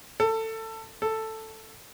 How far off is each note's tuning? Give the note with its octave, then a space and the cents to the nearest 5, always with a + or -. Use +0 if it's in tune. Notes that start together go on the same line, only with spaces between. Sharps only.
A4 +20
A4 +5